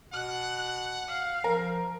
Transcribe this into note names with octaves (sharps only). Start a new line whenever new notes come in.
B2 F#5 F#6
F5
F3 A#4